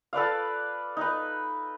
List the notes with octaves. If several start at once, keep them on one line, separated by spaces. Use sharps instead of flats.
A4 B4 D5 F5
D#4 B4